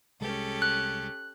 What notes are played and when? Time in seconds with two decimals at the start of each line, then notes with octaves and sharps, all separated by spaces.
0.21 C2 G#3 C#4 G4 A4
0.62 F#6